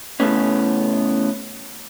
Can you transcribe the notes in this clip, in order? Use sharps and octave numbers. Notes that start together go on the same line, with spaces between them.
C#3 E3 G3 A3 B3 C#4